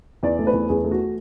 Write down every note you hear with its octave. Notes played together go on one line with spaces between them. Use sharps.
E2 D5
A3
B4
E2
E2 G#4
A3
F#4